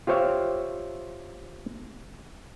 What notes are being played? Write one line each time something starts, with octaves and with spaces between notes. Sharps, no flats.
F4 G4 C5 C#5 E5 F5